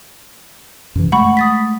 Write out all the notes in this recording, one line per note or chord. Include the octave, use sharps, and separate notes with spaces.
F#2 C3 E3
G#3 A3 F#5 B5 C#6
D#6 A6 B6